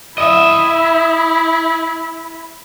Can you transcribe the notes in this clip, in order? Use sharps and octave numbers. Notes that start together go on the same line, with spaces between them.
E4 D#5 E5